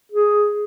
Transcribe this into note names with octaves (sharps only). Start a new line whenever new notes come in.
G#4